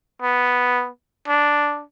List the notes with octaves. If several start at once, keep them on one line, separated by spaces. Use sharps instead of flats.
B3
D4